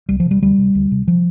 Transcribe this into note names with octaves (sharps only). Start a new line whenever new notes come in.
C2 G3
F3
C3
G3
D2 G3
C3
D2
C3
F3